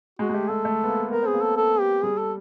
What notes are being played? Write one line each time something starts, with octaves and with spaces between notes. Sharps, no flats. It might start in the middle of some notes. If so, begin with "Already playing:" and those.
G#3 F#4
G#3
A3 G4
A3 A4
A3
B3
A#3
B3 A#4
C4 G#4
A#3
A4
A4
G4
G3 G#4
A4